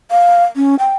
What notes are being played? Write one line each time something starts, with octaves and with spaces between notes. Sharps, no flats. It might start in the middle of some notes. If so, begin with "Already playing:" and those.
F5
C#4
G5